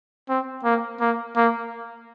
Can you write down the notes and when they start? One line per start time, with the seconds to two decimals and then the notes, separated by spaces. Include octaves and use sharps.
0.29 C4
0.64 A#3
1.00 A#3
1.36 A#3